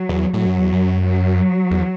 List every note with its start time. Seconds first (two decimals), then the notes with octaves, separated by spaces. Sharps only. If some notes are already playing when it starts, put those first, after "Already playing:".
Already playing: F#3
0.09 E2
0.33 A2 F#3
0.46 F#2
0.59 E2
0.73 F#2
1.03 F#3
1.71 E2